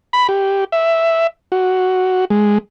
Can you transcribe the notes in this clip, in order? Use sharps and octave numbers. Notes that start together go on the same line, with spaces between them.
B5
G4
E5
F#4
G#3